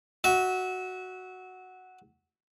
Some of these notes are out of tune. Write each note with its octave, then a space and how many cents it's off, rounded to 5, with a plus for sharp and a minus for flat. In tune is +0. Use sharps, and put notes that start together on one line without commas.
F#4 +0 E5 -25